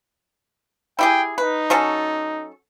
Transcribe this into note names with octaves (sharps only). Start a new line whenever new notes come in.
E4 G4 G#4 G5
D#4 B4
F#3 C#4 A4